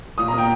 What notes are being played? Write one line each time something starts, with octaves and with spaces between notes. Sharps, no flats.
A#2 D#6
A#5
A#3
G5